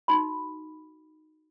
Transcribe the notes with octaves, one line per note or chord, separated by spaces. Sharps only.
D#4 F#4 B5